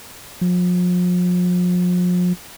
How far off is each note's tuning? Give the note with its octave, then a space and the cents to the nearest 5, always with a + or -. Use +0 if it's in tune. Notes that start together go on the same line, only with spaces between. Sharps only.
F3 +40